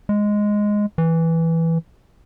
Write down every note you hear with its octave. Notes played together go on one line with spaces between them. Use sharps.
G#3
E3